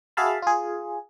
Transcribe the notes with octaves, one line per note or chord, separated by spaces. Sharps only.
F#4 G#4 E5 F5 A5 B5
F4 G#4